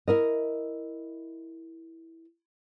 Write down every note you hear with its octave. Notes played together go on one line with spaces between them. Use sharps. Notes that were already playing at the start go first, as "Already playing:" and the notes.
E4 A#4 D#5